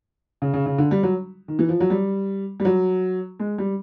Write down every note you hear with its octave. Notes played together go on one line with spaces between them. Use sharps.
C#3
C#3
C#3
D3
G3
F#3
D#3
E3
F3
F#3
G3
G3
F#3
G#3
G3